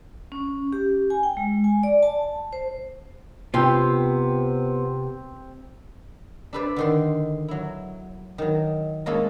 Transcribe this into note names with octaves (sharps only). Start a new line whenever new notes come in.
C#4
G4
G#5
G5
G#3
G#5
D5
A5
C5
C3 B3 C4 F4 C5 G5
D4 A4 B4 C5 D5 E5
D3 D#3 C6
F#3 E4
D#3 F#3
G#3 A#3 C#4 F4 G#4 A4